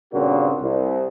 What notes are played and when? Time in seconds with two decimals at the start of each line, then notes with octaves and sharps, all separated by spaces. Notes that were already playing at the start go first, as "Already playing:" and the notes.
0.13 G2 A#2 C#3 A#3 C4 F#4
0.61 C2